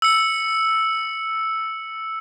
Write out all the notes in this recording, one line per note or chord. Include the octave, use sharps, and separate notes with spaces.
E6 C#7